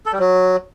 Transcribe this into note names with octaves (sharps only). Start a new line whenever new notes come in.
A4
G3
F#3